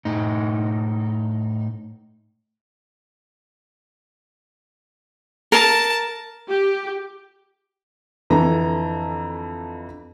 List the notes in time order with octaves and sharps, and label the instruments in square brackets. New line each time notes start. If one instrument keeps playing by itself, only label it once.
[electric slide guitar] A2 D#4
[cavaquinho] A#4 [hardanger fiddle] A5
[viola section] G4
[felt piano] F2 D3 E3 A#5